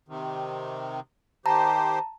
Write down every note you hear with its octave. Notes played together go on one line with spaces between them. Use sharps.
C3 D#3
D#3 G4 C5 A5 A#5